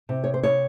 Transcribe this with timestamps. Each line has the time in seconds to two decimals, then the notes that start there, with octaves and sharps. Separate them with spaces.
0.09 C3
0.24 C#5
0.34 C5
0.43 C#5